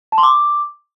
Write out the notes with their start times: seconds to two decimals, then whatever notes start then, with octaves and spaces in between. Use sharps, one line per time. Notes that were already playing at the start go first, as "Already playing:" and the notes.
0.12 A5
0.18 C6
0.23 D6